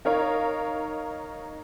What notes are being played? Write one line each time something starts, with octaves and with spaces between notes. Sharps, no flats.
D#4 A#4 C#5 F5